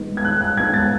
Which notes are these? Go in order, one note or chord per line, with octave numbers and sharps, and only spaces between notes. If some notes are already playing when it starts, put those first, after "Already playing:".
Already playing: D#3 G#3 B3 D#4
G#6
D#3 F#6
F#6
G#3 B3 D#4 G#6
A6